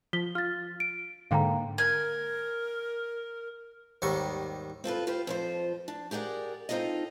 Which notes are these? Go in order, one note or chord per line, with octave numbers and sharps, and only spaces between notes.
F3 B6 G7
F4 F6 A6
D7
G#2 D3 A#3 F5 G5 A#5
A#4 G#5
D#2 G#2 D#3 G3 C#6
C4 F4 A4 B4
F4 G4 B4 C5
F2 F3 C5
D4
G4 G#4 A#4 D5 F#5
C4 D#4 F4 A4 D#5